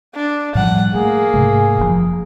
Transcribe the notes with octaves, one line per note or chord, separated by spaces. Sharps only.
D4
A2 F3 G3 F#5
A3 A#3 G#4
G#2 C3 A3
F#1 B2 F3